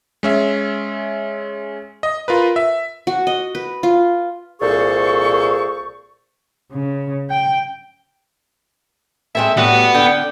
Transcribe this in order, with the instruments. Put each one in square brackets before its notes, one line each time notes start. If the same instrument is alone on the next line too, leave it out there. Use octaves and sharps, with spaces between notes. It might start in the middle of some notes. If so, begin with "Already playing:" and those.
[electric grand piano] G#3 C#4 E5
D#5
F4 A#4 B4
E5
[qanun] F#4
D#5
B4
F4
[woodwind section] C2 A#2 G#4 A4 C5 C#6
[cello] C#3
G5
[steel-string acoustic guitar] G#3 C4 A4 [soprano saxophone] E5
[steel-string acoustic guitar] A2 G3 [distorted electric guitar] B3 [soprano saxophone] F#4
[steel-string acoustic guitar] D3 [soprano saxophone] G5